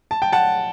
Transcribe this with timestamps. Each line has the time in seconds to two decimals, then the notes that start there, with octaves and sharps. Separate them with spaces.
0.11 A5
0.22 G5
0.32 F#5 A5